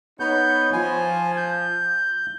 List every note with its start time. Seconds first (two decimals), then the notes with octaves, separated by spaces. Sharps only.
0.20 B3 D#4 C#5 G6
0.73 F3 G#5
1.37 G6